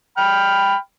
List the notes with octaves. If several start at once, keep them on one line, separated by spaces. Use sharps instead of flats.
G5 B5 F6